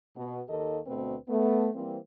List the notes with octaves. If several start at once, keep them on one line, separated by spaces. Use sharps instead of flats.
B2
D#2 D#3 A#3 G4 A4 D#5
D2 B2 A3 B3 C4 B4
A3 B3
E3 G3 A#3 C4